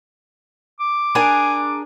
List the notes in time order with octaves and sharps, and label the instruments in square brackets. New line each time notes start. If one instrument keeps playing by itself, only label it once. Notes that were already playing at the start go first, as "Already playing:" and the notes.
[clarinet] D6
[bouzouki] D4 G#4 A#4 [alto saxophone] G#5